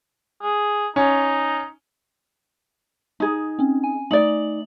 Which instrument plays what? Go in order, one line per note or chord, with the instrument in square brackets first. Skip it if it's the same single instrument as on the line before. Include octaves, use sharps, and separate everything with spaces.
[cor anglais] G#4
[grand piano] C#4 [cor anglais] D#4
[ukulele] D#4 G#4
[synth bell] C4 C#4
G#5
[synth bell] A3 F#7 [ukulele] D#4 D5